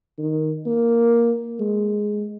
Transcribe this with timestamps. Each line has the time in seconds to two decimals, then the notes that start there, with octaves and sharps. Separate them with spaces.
0.19 D#3
0.66 A#3
1.60 G#3